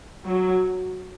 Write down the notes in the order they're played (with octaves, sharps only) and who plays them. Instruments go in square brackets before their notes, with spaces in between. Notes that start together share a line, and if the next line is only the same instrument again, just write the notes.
[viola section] F#3